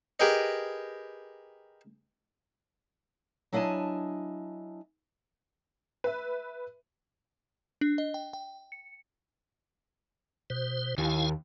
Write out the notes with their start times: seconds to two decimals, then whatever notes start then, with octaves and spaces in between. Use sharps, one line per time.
0.20 G4 G#4 A#4 B4 D#5
3.53 F#3 D4 E4 D#5 G#5 A5
6.04 B4 E5
7.81 D4
7.98 D#5
8.14 G5
8.33 G5
8.72 C#7
10.50 B2 C5
10.98 D#2 E4 F5 G#5